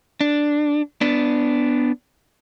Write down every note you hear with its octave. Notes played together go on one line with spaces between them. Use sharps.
D4
B3 D4